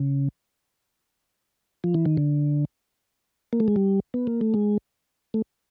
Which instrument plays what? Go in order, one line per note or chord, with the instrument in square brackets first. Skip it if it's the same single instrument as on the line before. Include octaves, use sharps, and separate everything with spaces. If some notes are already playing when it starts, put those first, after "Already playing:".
Already playing: [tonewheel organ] C#3
F3
E3
D#3
D3
A#3
A3
G#3
G3
B3
A#3
A3
G#3
A3